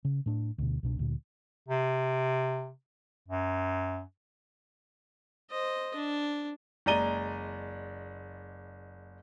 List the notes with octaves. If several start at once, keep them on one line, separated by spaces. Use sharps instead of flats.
C#3
A2 D4
D2 B2
C2 B2 D4
D2 A#2
C3
F#2
C5 D#5
D4
F#1 G#3 D5 A#5 D#7 G7